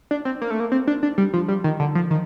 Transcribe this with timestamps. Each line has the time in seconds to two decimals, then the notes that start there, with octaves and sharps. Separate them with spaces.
0.11 D4
0.25 C4
0.41 A#3
0.51 A3
0.60 A#3
0.72 C4
0.87 D4
1.03 D4
1.18 G3
1.34 F3
1.48 G3
1.64 D#3
1.80 D3
1.95 F3
2.10 D#3